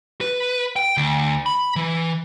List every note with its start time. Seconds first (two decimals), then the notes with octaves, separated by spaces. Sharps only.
0.21 B4
0.76 G5
0.97 D2
1.46 B5
1.76 E3